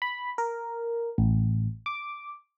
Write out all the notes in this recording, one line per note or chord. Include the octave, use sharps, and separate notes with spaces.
B5
A#4
A1
D6